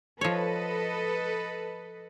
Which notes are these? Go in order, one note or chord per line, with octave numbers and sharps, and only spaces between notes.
F3 A4 B4 C#5 D#5